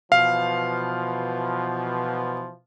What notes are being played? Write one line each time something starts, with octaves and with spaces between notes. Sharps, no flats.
B2 E3 F3 F5